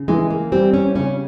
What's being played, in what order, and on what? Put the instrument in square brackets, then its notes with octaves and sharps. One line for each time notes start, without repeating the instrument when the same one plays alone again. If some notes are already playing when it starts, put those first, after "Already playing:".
Already playing: [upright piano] C#3
[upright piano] E3 [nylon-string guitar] G#3
[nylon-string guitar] A#3
[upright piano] G3 [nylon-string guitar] C4
[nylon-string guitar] C#4
[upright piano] C#3 [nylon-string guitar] C#4